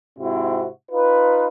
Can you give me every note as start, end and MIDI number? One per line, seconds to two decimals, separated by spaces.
0.19 0.68 44
0.19 0.68 48
0.19 0.68 60
0.19 0.68 64
0.19 0.68 66
0.92 1.48 63
0.92 1.48 65
0.92 1.48 71